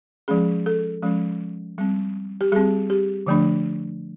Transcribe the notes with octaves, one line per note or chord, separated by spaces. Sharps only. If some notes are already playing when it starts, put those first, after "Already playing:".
F3 G#3 C#4 G#4
A4
F3 G#3 C#4
G3 C4
G4
G3 C4 G#4
G4
D3 F3 A3 D4